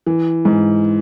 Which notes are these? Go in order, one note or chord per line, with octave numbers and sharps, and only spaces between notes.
E3
G#2